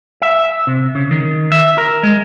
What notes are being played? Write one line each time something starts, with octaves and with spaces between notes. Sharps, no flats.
E5
C3
C#3
D#3
E5
A#4
G#3